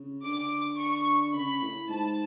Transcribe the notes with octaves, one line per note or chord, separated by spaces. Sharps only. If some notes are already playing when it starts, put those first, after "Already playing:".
Already playing: C#3
D3 D6
C#6
C#3 B5
A2
G#2 A5